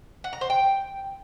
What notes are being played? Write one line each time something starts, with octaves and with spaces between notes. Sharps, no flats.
F#5
A#5
C5
G5